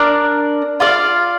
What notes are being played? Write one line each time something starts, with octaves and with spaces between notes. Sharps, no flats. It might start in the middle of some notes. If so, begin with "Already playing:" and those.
Already playing: D4 A#4 D5
F4 D5 F5